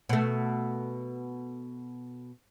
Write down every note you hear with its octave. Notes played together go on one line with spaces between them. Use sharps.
B2 A3